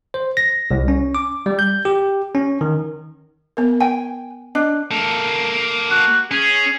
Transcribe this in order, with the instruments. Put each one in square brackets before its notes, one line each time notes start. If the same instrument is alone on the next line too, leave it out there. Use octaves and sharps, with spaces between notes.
[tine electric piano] C5
A#6
C2
C#4
D6
G3
G6
G4
C#4
D#3
[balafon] B3 A#4
[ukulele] G5 G#5
[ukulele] D4 [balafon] D#5
[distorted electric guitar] A#3 A4
[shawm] F#4
[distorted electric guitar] C#4 [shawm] G#4